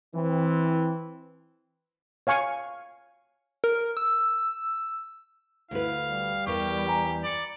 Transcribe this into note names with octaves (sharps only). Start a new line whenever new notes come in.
E3 C4
C#5 F5 G#5 C#6
A#4
E6
D2 E4 B4 F5
G3
E2 E3 G4 A#4 C#6
G#5 A#5 B5
D5 B5 C#7